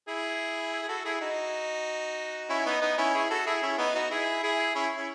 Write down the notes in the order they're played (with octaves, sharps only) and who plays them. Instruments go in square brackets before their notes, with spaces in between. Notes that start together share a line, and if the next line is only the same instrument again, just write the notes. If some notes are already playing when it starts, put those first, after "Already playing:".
[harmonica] E4 G#4
G#4
F#4 A4
E4 G#4
D#4 F#4
C#4 E4
B3 D#4
B3 D#4
C#4 E4
E4 G#4
F#4 A4
E4 G#4
C#4 E4
B3 D#4
D#4 F#4
E4 G#4
E4 G#4
C#4 E4
C#4 E4